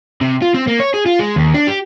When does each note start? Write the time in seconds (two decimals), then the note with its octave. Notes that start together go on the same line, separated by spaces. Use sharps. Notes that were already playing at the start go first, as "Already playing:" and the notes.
0.21 C3
0.42 F4
0.54 C4
0.68 A#3
0.80 C#5
0.94 G#4
1.06 F4
1.20 G#3
1.36 D#2
1.54 D4
1.67 G4